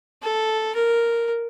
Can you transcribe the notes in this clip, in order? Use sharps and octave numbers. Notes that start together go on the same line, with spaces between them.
A4
A#4